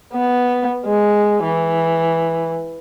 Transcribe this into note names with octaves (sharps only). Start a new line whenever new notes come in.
B3
G#3
E3